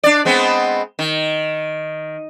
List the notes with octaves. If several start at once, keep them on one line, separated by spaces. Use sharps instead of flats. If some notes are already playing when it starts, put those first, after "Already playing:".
D4 D5
G#3 B3 C4
D#3